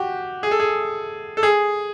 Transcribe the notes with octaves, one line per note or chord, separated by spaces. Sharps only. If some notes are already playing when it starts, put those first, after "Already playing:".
Already playing: F#4 G4
G#4
A4
G#4
A4
G#4